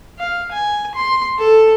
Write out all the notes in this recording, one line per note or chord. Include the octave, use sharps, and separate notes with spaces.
F5
G#5
C6
A4